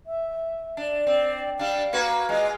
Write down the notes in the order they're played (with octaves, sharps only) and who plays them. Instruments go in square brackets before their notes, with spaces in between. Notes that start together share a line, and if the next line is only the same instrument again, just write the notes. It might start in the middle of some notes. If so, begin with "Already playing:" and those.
[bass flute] E5
[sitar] D4
[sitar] C4 [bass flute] D5
[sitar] G3 D4 [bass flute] F5
[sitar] A#3 F#4 B4
[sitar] G#3 F4 [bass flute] D#5